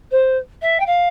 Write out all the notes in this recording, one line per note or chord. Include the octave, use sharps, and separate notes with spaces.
C5
E5
G5
F5